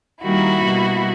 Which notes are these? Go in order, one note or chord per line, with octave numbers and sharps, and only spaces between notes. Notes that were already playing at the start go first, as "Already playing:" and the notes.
D#3 G3 A#3 E4 F#4
B2 G3 A#3